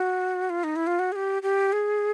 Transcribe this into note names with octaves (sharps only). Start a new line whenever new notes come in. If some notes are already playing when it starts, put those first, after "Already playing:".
Already playing: F#4
F4
D#4
E4
F4
F#4
G#4
G4
G4
G#4